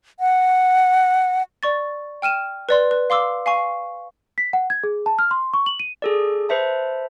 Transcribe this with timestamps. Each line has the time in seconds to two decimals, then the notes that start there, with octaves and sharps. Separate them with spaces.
0.20 F#5
1.63 D5 C#6 A6
2.22 G5 F6 D#7 E7
2.69 B4 D5 C6
2.91 B4
3.10 F5 C6 D6 E6
3.46 F5 G#5 C#6
4.38 B6
4.53 F#5
4.70 G#6
4.84 G#4
5.06 A5
5.19 F6
5.31 C6
5.54 C#6
5.66 F#7
5.80 D#7
6.02 G#4 A4 D5
6.49 B4 C5 E5 A5